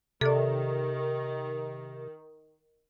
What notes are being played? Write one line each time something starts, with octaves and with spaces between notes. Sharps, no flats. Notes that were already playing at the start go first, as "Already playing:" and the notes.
C3 D#3 A4 D5